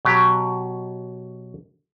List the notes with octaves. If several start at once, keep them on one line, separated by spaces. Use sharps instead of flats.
B2 F#3 G4